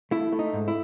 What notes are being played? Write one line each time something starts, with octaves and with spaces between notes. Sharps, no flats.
A3 E4
A3
D#4
G#2
E4